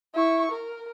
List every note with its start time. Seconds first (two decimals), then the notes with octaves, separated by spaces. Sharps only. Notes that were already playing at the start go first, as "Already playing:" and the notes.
0.14 E4 C#6
0.52 A#4